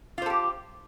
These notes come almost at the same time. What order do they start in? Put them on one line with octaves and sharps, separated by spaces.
F4 C5 A4 G4